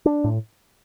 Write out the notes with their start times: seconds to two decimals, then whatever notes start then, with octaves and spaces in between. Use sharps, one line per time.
0.06 D4
0.24 A2